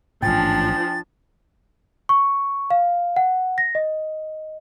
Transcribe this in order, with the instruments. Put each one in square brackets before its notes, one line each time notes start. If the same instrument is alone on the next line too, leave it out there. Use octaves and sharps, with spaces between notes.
[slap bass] A1 G#2 [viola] F3 D4 [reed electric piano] G5 G#5 [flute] A6
[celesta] C#6
F5
F#5
A#6
D#5